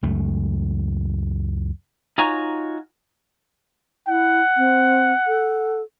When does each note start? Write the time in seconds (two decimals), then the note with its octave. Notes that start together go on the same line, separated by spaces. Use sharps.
0.03 C#2 F#2 A3
2.18 D#4 F4 F#4 C#5 G#5 A#5
4.08 E4 F#5
4.57 C4
5.27 A4